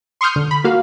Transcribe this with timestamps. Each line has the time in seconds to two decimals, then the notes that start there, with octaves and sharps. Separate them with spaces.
0.21 C6 C#6 D#6 F6 G6
0.36 D3
0.51 B5
0.64 A#3 F#4 F5